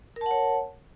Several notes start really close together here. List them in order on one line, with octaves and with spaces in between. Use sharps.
A#4 A5 F#5 C#5